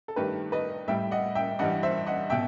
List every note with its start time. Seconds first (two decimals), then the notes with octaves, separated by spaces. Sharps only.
0.08 A4
0.16 G2 D#3 A3 G4 B4
0.52 B4 D#5
0.88 A2 G3 E5 G5
1.11 D#5 F#5
1.35 E5 G5
1.59 G2 E3 G3 D#5 F#5
1.83 C5 E5
2.07 D#5 F#5
2.30 B2 E5 G5